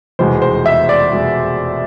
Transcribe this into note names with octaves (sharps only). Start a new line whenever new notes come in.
F1 E2 B2 G#3 C5
C5
E5
D5
B2 G#3